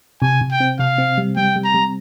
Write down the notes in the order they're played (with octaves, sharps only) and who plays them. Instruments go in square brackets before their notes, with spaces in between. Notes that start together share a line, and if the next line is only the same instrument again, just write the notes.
[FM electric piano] C3 [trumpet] G#5
[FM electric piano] C3
[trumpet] G5
[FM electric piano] C4
[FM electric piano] C3 [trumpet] F5
[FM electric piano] C4
G3
[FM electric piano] G3 [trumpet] G5
[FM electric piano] G3
[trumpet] A#5
[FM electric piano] G3